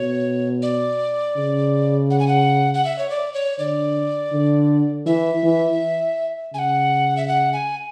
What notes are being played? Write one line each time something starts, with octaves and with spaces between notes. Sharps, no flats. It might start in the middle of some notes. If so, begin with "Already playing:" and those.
Already playing: B2 C#5
D5
C#3
F#5
G#5
F#5
F#5
E5
C#5
D5
C#5
D3 D5
D3
E3 E5
E3
C#3 F#5 G#5
E5
F#5
G#5